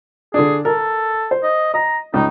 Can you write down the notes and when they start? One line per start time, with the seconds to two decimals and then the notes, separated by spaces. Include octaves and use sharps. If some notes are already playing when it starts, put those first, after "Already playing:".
0.34 D3 D4 G#4
0.65 A4 A#4
1.31 C5
1.43 D#5
1.74 D#5 A#5
2.14 C#2 D#4